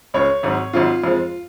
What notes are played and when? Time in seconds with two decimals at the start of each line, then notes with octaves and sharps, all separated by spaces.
0.14 C#2 C#3 G#3 C#5
0.43 G#1 G#2 F#3
0.73 G#1 G#2 F#3 F4
1.04 F2 F3 G#3